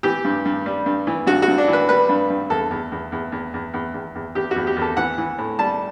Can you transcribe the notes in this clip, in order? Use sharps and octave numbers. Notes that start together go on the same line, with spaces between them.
E3 G4
G2
G2
G3
G2
E3
G2 F#4
F#4
G2
D4
E3
B4
G3 B4
G2
G2
E2 A4
E2
E2
E2
E2
E2
E2
E2
E2
E2 G4
F#4
E2
G4
E2
A4
E3 F#5
E3
A2
G3 A5